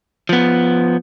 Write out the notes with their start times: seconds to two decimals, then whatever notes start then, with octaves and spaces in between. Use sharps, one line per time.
0.29 F3 B3